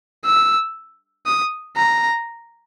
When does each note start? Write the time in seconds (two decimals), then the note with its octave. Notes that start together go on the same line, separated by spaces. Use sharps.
0.25 E6
1.26 D#6
1.77 A#5